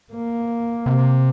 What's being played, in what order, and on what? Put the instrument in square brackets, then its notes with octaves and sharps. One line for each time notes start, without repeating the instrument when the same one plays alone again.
[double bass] A#3
[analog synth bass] C3